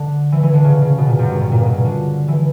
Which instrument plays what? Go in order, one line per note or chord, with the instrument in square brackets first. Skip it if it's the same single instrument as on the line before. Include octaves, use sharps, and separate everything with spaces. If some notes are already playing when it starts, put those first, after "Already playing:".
Already playing: [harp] D3
E3
E3
D3
C#3
C#3
B2
A#2
F#2
G2
G2
A#2
B2
C#3
D3
E3